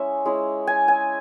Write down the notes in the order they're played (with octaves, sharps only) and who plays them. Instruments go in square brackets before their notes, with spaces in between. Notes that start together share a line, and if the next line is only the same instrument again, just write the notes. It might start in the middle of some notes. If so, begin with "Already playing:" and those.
Already playing: [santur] G#3 C#4 E4 E5
G#3 C#4 E4
G#5
G#5